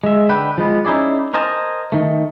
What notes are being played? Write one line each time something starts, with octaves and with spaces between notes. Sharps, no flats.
G#3 E5
D3 B4 G5
F3 G#3 B3
C#4 D#4 E4 G#4 D5
A#4 C5 D#5 G#5 A5
D#3 A3